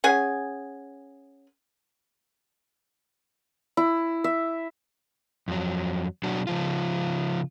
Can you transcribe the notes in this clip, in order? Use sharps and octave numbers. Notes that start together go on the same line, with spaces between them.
C#4 G#4 F#5 G#5
E4
E5
F2 F#3
B2 F#3 D4 F#4
C#3 F3 F4